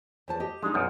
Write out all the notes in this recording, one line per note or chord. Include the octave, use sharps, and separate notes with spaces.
E2 C5 A5
G4 D#5
G3 G#3 D4 D#4
B1 F#2 F3 B3